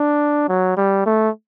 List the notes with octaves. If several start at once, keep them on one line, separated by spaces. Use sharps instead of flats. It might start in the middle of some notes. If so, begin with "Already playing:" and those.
Already playing: D4
F#3
G3
A3